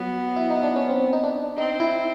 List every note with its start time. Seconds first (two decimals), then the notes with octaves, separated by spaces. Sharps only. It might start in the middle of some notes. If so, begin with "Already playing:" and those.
Already playing: F#3 B3
0.36 E4
0.50 D#4
0.63 D4
0.76 C#4
0.89 C4
1.13 D#4
1.24 D4
1.57 C4 D#4
1.80 E4